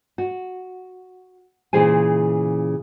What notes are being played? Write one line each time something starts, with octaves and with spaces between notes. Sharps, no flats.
F#4
A#2 C#3 E3 G#4 C5 G#5